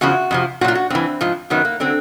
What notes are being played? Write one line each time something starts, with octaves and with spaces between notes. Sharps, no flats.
E2 C#3 F3 F#4
F2 C3 F3
A#2 F#3 F4 F#4
F#4
G2 E3 C4
G#2 F3
F#2 D#3 F#3 B3
A#3
D3 F#3 C4